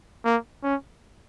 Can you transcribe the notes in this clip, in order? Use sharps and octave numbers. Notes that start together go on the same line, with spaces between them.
A#3
C#4